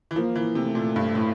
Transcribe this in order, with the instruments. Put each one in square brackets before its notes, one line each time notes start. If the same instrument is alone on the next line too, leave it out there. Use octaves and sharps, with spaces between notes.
[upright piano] E3
[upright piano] F3 [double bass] A#3
[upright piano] E3
[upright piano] C3 [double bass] A3
[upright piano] A#2
G2
A2